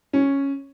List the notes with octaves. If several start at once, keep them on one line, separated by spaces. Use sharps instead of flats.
C#4